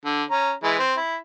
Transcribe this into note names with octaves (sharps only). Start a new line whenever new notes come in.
D3
C#4 A#5
E3 G#3 E4
C4
E4